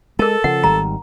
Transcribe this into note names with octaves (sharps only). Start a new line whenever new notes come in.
G#3 A4 A#4 A5
C#3 F3 F#5
G#1 D#3 G3 A#5